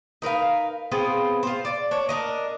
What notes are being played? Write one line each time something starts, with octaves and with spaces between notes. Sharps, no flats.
D#4 A#4 B4 F5
B3 C4 F4 G#4
F4 C5
D5
D4 C#5
D4 A#4 D#5